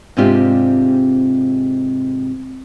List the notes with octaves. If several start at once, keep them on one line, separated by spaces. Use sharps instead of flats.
G#2 C3 C4 D4 F4 G4